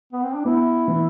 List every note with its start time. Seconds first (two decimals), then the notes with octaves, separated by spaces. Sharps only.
0.12 B3
0.23 C4
0.34 D4
0.45 B3 E4
0.88 E3